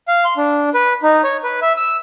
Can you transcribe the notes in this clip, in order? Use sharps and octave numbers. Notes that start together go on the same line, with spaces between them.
F5
C6
D4
B4
D#4
C#5
B4
E5
E6